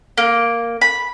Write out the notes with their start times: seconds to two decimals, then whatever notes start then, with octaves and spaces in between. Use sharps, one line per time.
0.18 A#3
0.81 B5